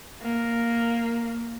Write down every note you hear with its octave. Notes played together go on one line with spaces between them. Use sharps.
A#3